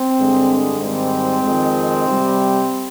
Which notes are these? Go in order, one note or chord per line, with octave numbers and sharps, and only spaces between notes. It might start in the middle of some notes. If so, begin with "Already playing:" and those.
Already playing: C4
G2 D3 G#3
G#2 D#3 G3 C4
F2 D#3 G#3
C3 G3